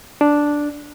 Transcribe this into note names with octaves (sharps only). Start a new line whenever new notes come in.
D4